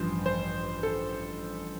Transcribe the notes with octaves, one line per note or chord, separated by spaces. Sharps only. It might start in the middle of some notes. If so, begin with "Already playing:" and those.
Already playing: A1 G2 F3 C5
C5
A4